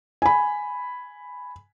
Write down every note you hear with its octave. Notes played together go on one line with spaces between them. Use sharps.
G#5 B5